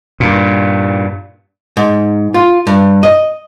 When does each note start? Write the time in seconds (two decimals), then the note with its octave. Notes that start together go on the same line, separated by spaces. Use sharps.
0.20 G2 A#2
1.77 G#2
2.34 F4
2.67 G2
3.03 D#5